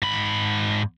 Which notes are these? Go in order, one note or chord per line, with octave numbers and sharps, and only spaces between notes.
G#2 B5